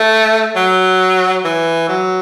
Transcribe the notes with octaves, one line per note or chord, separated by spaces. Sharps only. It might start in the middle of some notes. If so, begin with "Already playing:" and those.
Already playing: A3
F#3
E3
F#3